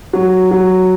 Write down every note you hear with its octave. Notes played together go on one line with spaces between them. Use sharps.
F#3
F#3